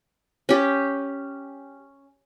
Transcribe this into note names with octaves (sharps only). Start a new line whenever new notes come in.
C#4 G4